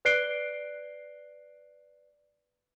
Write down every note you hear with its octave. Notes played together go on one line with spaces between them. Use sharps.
B4 D5 F#6 C7 D7 G7